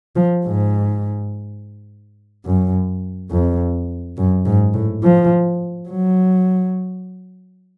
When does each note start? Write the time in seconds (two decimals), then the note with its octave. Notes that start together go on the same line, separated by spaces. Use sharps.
0.16 F3
0.45 G#2
2.45 F#2
3.31 F2
4.17 F#2
4.46 G#2
4.74 A2
5.03 F3
5.89 F#3